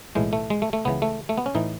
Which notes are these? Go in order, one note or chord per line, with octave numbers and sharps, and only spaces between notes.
B1 A2 E3 G#3
A3
G#3
A3
A3
C#2 C#3 E3 B3
A3
A3
B3
C#4
A2 E3 D#4